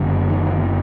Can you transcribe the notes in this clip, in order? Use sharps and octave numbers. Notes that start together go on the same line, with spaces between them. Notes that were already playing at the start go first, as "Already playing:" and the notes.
Already playing: F#1 F#2 D3
D#3